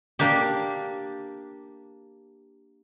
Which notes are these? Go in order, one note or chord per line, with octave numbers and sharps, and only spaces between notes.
A#3 D4 G4